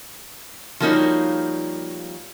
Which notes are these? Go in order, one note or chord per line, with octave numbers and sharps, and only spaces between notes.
F3 G3 A#3 D#4 F#4 C#5